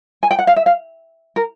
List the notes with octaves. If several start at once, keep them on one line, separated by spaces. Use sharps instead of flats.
G#5
G5
F#5
F5
E5
F5
A#4